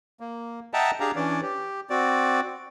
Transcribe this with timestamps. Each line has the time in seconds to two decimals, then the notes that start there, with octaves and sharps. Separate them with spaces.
0.20 A#3
0.73 D#5 E5 F#5 G5 A5 A#5
1.00 D4 G4 G#4 F5 A#5
1.16 E3 C#4 D4 D5
1.42 G4
1.90 C4 F#4 D5